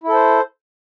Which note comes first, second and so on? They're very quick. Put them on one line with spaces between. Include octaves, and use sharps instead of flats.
E4 A4 C5